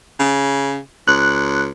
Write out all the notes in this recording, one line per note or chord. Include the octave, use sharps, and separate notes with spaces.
C#3
C#2 F#6